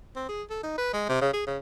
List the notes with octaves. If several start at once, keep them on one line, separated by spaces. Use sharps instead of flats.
C4
G#4
A4
D#4
B4
G#3
C3
C#3
G#4
C#3